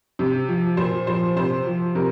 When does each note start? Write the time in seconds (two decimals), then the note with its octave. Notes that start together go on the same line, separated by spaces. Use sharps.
0.19 C3
0.48 F3
0.77 A#2 C5
1.07 F3 C5
1.36 C3 C5
1.66 F3
1.95 C3 A#4